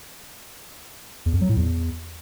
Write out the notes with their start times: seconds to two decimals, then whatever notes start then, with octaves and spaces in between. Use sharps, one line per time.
1.26 E2
1.34 F2
1.41 F#3
1.49 A2
1.57 E2